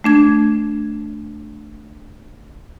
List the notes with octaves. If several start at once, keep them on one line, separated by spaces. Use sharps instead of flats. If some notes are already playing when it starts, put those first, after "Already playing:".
A3 D4 G#6